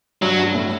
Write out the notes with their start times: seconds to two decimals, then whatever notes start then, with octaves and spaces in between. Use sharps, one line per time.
0.22 G2 F#3
0.39 G2
0.55 A2